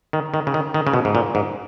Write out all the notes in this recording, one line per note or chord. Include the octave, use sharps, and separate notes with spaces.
D#3
D#3
C#3
D#3
D#3
C#3
B2
G#2
A#2
G#2